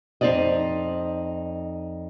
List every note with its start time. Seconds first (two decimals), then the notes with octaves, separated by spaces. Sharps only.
0.21 F2 C4 D#4 G4 D5 D#5